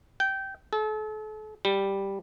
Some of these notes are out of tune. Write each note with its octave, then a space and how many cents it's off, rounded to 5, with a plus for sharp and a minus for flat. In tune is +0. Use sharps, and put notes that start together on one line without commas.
G5 -15
A4 -40
G3 +0